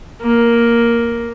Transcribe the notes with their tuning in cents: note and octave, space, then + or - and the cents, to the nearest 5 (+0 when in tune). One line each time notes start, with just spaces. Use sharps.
A#3 +5